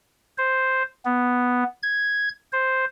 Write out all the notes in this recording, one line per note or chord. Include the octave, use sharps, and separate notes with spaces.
C5
B3
G#6
C5